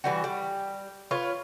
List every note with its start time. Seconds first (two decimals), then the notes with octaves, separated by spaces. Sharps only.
0.04 E3 G3 F#4
0.24 G3
1.11 F4 B4 C#5